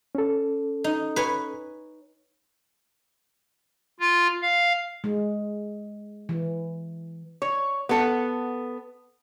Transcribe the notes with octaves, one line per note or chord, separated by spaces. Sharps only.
C#4 A4
D#4
B4 C#5 G#5
F4
F5
G#3
E3
C#5
B3 A4 F#5